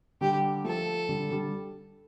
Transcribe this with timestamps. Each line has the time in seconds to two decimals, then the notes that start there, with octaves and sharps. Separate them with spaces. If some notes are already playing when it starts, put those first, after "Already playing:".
0.21 D3 G3 G4
0.64 F3 A3 A4
1.09 D3 G3
1.31 D3 G3